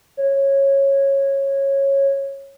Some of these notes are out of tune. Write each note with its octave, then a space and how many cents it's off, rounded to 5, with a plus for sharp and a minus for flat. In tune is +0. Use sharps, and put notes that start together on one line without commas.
C#5 -15